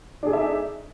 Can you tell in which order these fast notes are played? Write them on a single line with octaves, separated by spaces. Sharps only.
D4 G#4 A4 E5 D#4